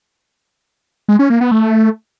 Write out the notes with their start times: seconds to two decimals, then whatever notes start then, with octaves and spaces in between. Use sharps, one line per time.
1.08 G#3
1.19 C#4
1.30 A#3
1.41 B3
1.51 A3